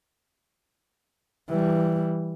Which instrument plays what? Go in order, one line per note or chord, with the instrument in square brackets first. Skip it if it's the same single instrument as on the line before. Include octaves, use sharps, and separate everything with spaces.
[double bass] E3 G3